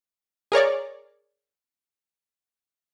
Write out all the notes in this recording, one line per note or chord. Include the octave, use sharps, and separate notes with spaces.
G#4 A#4 C#5 D5